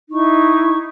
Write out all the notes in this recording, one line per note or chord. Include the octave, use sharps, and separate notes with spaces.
D#4 E4 C#6